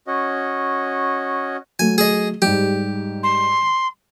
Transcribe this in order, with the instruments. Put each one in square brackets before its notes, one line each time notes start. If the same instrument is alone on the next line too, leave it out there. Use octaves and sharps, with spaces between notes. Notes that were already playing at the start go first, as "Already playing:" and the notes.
[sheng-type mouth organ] C#4 F#4 D#5
[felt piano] F#3 A3 [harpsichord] G#5
[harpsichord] G#4 D#5
[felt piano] G#2 G3 [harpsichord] G4
[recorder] C6